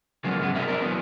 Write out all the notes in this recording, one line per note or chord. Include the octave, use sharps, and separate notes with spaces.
C#3 F3 F#3 G#3 A#3 B3
C#2 G#2 F#3 G#3 B3
G2 C3 C4 A#4 D#5 E5
C4 D4 A#4
E3 F#3 B3